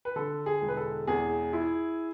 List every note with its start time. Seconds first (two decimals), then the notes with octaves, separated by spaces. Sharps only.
0.05 B4
0.16 D3 A4
0.46 G#4
0.62 E1
0.68 B4
0.77 A4
1.07 E2 G#4
1.53 E4